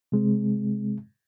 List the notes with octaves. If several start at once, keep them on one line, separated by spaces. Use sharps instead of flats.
C3 G#3 C4